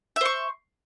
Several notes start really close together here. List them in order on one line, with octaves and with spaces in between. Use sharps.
E5 C5 C#6